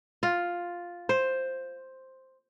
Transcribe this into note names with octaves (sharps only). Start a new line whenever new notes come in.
F4
C5